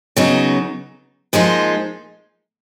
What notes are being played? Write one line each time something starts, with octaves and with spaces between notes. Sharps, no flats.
C#3 F#3 B3 D#4
A#2 F3 G#3 D#4